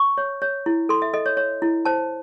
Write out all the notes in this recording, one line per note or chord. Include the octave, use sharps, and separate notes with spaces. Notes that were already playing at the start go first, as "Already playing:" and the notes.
Already playing: C#6
C#5
C#5
E4
A4 C6
E5
A4 D#5
C#5
C#5
E4
C5 A5